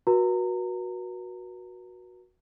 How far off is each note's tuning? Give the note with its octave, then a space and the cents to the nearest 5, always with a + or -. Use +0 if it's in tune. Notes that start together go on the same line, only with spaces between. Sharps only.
F#4 -10 B4 -45 A#5 -25